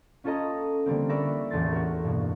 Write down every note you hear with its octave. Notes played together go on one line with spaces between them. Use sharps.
C#4 F4 A4 C#5 D#5 A#5
D3 G3 A#3 C4
A#4 B4 D5 E5 C#6 A#6
A1 E2 A3 C6 A6
F#4 A#4
G2 B2 A#3